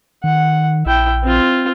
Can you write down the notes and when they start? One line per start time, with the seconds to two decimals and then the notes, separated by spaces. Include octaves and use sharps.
0.24 D#3 F#5
0.86 A#1 E4 G5
1.23 C4 F4